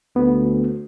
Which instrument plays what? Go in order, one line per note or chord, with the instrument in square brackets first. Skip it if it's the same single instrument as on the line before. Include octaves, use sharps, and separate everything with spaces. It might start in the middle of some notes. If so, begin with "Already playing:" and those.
[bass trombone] D2 [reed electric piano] B3